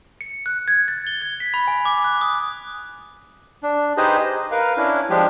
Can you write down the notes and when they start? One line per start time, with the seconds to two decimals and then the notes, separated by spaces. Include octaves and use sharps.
0.21 C#7
0.46 F#6
0.68 G#6
0.88 A6
1.07 G7
1.22 G#6
1.40 B6
1.54 B5
1.68 G#5
1.85 D6
2.04 F#6
2.21 D#6
3.63 D4
3.97 D#4 G4 G#4 B4 C5 D#5
4.25 D#5
4.51 A#4 B4 F5
4.77 C#4 D4 E4
5.10 F3 G#3 D4 G4